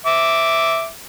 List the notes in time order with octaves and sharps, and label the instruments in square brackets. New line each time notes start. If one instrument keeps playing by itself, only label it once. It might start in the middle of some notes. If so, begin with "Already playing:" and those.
[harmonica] E5 D6